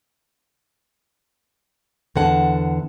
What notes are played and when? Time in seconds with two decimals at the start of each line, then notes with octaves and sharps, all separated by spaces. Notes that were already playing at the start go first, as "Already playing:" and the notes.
2.16 E2 D3 F#5 A5